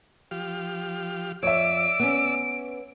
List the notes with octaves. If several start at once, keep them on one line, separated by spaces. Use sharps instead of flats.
F3 G4 F6
F2 C#5 D5 E5 E6 D7
B3 C#4